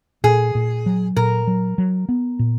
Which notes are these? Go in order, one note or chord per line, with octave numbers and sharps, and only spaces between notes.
A#2 G#4
A#2
F#3
A#2 A#4
F#3
F#3
B3
A#2